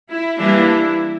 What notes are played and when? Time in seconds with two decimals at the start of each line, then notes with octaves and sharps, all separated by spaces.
0.12 E4
0.40 E3 G3 A#3 D4 E4